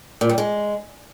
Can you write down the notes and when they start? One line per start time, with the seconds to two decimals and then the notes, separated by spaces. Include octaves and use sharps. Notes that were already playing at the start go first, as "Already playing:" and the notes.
0.21 A#2
0.29 G3
0.38 G#3